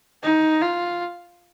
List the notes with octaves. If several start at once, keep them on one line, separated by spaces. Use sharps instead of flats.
D#4
F4